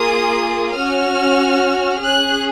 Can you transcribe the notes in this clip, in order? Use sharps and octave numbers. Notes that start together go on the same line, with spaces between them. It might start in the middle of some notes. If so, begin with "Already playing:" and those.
Already playing: A#3 F4 G#4 D#6
C#4 F#4 F6
C#4 G#4 F#6